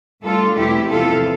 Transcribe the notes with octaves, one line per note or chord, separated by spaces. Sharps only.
A2 G3 D4 F4 A4
E2 B2 A3 C4 E4 G4
E2 C3 F3 C4 E4 F4 A4